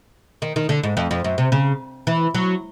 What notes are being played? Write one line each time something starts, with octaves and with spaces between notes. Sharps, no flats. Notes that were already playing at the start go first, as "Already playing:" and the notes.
D#3
D#3
D3
G#2
F2
F2
F#2
C3
C#3
E3
F#3